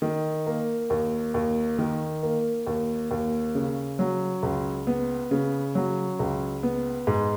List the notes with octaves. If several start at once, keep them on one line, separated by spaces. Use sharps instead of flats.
D#3
A#3
D#2
D#2
D#3
A#3
D#2
D#2
C#3
F#3
C#2
B3
C#3
F#3
C#2
B3
G#2